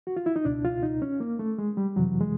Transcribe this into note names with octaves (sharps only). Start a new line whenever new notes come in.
F#4
F4
E4
D#4
C#2 B2 D4
F4
D#4
C#4
A#3
A3
G#3
G3
F2 C3 E3 F#3
G#3